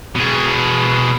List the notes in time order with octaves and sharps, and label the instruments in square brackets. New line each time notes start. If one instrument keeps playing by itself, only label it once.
[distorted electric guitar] B2 G#4